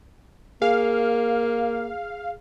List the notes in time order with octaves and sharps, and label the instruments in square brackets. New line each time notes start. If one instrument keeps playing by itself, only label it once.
[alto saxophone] A#3 [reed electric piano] G#4 [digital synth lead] F5